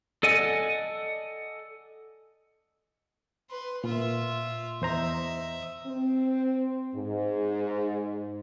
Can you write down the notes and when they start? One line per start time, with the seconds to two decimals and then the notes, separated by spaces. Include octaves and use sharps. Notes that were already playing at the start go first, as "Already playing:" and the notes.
0.23 A4 D5 D#5 F#5 G#5
3.50 B4 C6
3.84 A#2 F4 E5
4.82 E2 C5 D#5 E5 A#5
5.87 C4
6.96 G#2